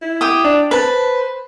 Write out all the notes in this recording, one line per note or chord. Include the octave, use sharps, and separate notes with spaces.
E4
G4 G5 D#6
D4
B4 C5 A5